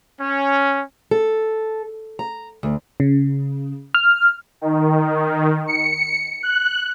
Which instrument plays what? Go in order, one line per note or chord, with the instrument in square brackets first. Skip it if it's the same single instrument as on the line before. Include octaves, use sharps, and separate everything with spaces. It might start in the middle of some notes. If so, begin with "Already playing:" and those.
[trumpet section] C#4
[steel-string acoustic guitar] A4
A#5
D2
[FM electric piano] C#3
F6
[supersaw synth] D#3
C#7
F#6